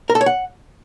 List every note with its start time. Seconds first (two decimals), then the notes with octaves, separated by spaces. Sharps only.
0.10 A#4
0.15 A4
0.21 C#5
0.26 F#5